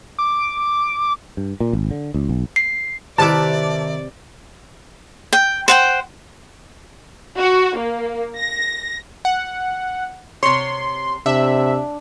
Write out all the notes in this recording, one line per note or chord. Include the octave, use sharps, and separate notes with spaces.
D6
G2
A#2
G#1
D3
C#2
B1
C7
C3 D#3 E4 B4 D5 E5 A5 D6
G5
C5 F#5 G5
F#4
A#3
A#6
F#5
C3 C#5 C6
C3 D4 E5